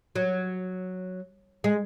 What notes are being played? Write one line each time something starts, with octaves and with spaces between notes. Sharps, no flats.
F#3
G#3